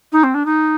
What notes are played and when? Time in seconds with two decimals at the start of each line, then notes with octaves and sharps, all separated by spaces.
0.12 D#4
0.23 C4
0.34 D4
0.45 D#4